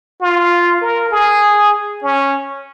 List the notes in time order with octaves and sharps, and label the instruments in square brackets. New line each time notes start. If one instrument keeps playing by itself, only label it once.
[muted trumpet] F4
A#4
G#4
C#4